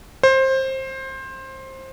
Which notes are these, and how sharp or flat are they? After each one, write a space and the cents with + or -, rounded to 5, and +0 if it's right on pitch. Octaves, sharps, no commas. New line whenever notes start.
C5 +20